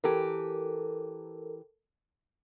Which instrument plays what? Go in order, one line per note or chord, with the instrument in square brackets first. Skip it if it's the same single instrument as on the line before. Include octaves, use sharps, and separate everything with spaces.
[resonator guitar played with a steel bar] E3 G4 [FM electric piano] A4 A#4